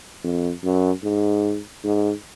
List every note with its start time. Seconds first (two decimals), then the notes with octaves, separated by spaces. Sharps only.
0.24 F2
0.64 F#2
1.04 G#2
1.84 G#2